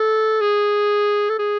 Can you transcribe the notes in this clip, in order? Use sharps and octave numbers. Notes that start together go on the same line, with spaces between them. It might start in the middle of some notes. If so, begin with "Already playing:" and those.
Already playing: A4
G#4
A4
G#4